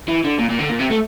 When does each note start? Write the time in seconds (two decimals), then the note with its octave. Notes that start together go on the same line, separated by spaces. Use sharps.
0.08 E3
0.24 D3
0.39 A#2
0.49 A#2
0.59 D3
0.70 A#2
0.80 C3
0.91 A3